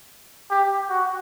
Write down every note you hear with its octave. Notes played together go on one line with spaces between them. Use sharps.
G4
F#4